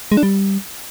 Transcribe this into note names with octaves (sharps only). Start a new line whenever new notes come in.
G#3
D4
G3